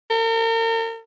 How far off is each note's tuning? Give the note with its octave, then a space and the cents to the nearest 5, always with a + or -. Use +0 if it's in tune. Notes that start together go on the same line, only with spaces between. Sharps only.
A#4 -40